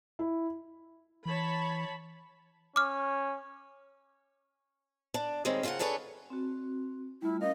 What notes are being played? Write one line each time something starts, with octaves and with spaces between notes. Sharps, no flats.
E4
E3 C#5 A5 B5
C#4 D6 F6
D4 D5
D#3 G3 G#3 C4 C#4
C#3 C4 F4 A#4 F#5
D4 G#4 A4 B4 C#5 D5
C4 F#4
G3 A3 E4 F4
C#4 A#4 D#5 F5